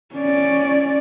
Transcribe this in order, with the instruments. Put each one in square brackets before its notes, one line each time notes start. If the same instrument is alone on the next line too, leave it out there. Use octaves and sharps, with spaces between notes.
[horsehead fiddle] C#4 D5